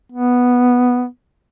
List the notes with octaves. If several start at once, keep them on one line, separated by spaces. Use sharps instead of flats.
B3